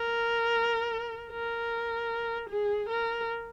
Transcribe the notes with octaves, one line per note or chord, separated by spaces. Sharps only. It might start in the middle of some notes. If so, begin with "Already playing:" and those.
Already playing: A#4
A#4
G#4
A#4